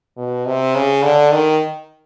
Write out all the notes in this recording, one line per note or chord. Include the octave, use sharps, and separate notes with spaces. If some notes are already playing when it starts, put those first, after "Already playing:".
B2
C3
C#3
D3
D#3